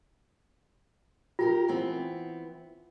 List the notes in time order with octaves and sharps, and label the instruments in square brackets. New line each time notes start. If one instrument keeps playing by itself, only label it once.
[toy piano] F4 [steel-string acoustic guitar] G4 A4 A#4
[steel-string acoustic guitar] E3 B3 C4